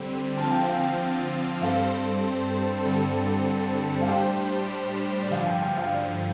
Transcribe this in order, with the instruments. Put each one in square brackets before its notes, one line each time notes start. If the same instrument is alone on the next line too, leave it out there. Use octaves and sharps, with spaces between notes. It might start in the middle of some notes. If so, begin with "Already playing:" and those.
Already playing: [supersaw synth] D3 G3 C4
[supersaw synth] D3 F3 C4 F4 [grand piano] A5
[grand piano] G5
F5
G5
[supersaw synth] G2 G3 C4 A4 C5 [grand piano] F5
[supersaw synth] G2 D3 G3 C4 A4
[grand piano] F5
[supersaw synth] A2 G3 D4 G4 C5 [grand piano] G5
[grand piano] D5
[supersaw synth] G2 D3 F3 [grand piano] F5
[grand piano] G5
G5
F5
D5